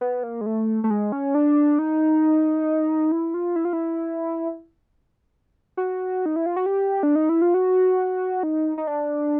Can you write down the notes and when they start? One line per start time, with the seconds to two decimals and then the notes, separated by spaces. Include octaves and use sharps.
0.01 B3
0.23 A#3
0.41 G#3
0.46 A3
0.84 A3
0.90 G#3
1.12 C#4
1.35 D4
1.79 D#4
3.12 E4
3.34 F4
3.56 E4
3.65 F4
3.73 E4
5.77 F#4
6.26 D#4
6.36 E4
6.46 F4
6.56 F#4
6.66 G4
7.03 D4
7.15 D#4
7.29 E4
7.42 F4
7.54 F#4
8.43 D#4
8.78 D#4
8.87 D4